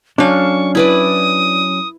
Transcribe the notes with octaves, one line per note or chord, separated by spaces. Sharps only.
F#3 C#4 D4 A4 F5 C#6
E4 B4 D5 D#6